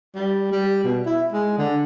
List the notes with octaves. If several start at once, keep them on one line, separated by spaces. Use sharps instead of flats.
G3
G3
B2
E4
G#3
D3